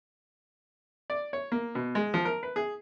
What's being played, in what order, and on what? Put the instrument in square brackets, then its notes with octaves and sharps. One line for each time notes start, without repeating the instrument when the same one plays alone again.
[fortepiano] D5
C#5
A#3
B2
G#3
F3
A#4
B4
G#4